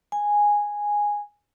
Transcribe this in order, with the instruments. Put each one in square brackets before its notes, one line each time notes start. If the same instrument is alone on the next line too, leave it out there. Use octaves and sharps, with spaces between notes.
[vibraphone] G#5